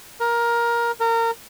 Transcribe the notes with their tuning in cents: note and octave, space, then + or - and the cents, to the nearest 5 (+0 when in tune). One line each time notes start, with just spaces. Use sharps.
A#4 +15
A#4 -25